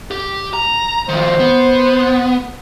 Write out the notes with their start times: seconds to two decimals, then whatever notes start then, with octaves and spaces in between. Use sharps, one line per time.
0.11 G4
0.53 A#5
1.09 D#3 F3 C5
1.40 B3